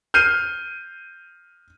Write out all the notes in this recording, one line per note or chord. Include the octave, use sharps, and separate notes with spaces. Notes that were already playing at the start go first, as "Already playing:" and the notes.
F6 G6 C7 D#7